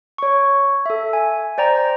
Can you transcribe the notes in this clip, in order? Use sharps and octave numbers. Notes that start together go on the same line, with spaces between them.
C#5 C#6
A4 E5
G#5
C5 D5 G5 A#5